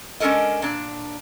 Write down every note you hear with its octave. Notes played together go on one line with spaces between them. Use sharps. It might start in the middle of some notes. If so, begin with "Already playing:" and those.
G#3 C#4 D4 A4 A#4 D#5
A#2 D4